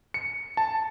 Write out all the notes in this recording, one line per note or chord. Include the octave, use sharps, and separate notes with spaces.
C#7
A5